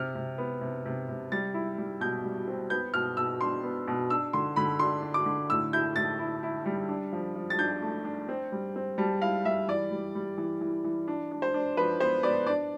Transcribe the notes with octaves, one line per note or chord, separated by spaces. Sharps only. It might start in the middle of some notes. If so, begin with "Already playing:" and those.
Already playing: C3 F6
C3
B3
C3
C3
C3
G3 A6
E4
G3
B2 G6
G3
C4
B3 G6
B2 F6
B2 E6
D4 C6
B3
B2
D4 E6
D3 C6
D3 B5
D4 C6
D4
D6
D3
A2 E6
E4 G6
A2 A6
E4
E4
G3
D4
F3
F3
A6
D4 G6
A3
D4
C4
G3
C4
G3 A5
E4 F5
G3 E5
E3 D5
G3
G3
E3
E3
E3
D4
D4
C5
D4
F3 B4
B3 C5
B3 D5
D4 D5